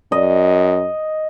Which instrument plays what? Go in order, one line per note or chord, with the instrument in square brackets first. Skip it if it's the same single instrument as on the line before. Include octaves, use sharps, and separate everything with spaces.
[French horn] F#2 [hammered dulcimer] D#5